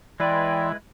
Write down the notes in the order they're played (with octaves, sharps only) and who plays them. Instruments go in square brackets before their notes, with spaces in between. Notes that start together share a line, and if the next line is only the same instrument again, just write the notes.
[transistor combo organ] E3 [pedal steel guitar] G#3 E4 B4 [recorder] D5 [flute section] D#5 G5 C6